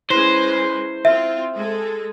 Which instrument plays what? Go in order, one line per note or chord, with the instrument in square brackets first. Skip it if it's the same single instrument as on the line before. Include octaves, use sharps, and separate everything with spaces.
[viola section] G#3 C#4 B4 [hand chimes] E4 C7 [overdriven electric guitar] C5
[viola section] C4 F4 [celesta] E5
[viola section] G#3 G#4 A4